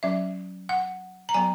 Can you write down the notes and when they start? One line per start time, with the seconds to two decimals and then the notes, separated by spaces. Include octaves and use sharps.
0.03 F#3 C#4 E5
0.69 F#5
1.29 A#5
1.34 F#3 B3 G#5